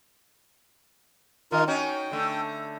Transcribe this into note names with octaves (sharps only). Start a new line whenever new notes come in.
D#3 D#4 F4 A#4
C#4 D#4 F#4 G5
D3 A3